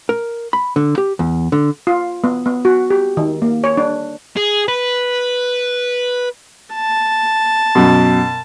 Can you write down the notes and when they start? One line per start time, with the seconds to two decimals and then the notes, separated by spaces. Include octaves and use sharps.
0.09 A#4
0.53 B5
0.76 D3
0.98 G4
1.19 E2
1.52 D3
1.87 F4
2.24 B3
2.46 B3
2.65 F#4
2.90 G4
3.17 D#3
3.42 A#3
3.64 C#5
3.77 D4
4.37 G#4
4.68 B4
6.74 A5
7.75 F#2 B2